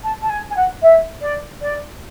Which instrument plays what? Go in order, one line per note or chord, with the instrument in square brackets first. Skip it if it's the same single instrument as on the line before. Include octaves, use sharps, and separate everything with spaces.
[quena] A5
A5
G#5
G#5
F#5
E5
D5
D5